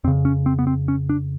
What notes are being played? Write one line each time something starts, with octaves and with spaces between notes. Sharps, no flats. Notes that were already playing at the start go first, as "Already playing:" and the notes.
F2 C#3 C4
C#4
C4
B3
C4
C#4
D4